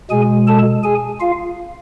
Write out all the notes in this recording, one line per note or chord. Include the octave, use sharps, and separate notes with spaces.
B2 G#3 G#4 G#5
A4 A5
G#4 G#5
F4 F5